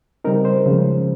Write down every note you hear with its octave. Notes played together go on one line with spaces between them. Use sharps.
C#3 G3 C4 D#4 A#4
C5
C#3 F3 G#3 C#4